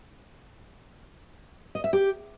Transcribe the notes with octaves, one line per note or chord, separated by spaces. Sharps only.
D#5
E5
G4